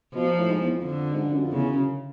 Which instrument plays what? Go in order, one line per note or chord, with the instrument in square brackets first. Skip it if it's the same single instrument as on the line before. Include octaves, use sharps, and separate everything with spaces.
[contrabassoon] B2 [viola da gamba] F3
[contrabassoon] A#2
A2
G#2
E2
F2
[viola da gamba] D3
[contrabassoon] G#2
G2
F#2
F2
[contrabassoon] E2 [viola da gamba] C#3
[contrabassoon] F#2